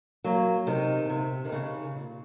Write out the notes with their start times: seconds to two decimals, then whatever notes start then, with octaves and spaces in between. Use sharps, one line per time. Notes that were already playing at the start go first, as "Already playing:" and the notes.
0.24 F#3 A#3
0.67 C3 D#3
1.05 C#3
1.10 C3
1.45 D#3
1.52 C#3
1.95 A#2